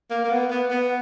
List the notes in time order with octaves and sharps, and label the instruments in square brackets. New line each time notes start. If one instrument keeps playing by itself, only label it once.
[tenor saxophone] A#3
A#3
B3
B3
B3